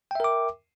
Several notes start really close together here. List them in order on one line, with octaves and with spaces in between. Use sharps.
G5 E5 A#4 D6